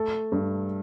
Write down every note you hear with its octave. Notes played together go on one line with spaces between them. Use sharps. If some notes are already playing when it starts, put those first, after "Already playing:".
Already playing: A3 A4
G2